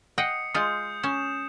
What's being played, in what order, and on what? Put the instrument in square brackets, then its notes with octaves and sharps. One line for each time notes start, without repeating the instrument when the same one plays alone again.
[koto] D#5 F#5 G5 [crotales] D#6 C7 C#7
[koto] G#3 F4 [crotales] D#6 G6
[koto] C#4 [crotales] E7